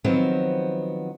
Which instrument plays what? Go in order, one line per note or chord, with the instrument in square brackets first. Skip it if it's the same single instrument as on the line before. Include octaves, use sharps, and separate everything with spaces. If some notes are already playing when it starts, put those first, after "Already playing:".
[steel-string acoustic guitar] D#3 F3 F#3 B3 C4